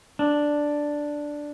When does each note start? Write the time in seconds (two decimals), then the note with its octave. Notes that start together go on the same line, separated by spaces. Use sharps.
0.19 D4